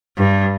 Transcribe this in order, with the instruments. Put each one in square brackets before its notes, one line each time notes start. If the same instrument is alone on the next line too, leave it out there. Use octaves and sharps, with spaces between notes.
[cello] G2